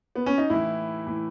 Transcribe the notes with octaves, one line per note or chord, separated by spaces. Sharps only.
B3
C#4
D#4
A2 E3 E4
A2 E3